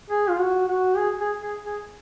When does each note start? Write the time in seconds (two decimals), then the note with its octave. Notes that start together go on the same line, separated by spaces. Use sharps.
0.10 G#4
0.29 F4
0.39 F#4
0.68 F#4
0.97 G#4
1.20 G#4
1.43 G#4
1.66 G#4